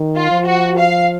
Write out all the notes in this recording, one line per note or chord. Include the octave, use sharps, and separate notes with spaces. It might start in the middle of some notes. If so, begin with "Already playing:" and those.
Already playing: D#3
F4
F3
F#4
F5